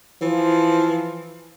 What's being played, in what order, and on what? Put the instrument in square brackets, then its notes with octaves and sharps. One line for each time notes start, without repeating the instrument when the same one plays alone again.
[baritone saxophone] E3 [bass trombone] F3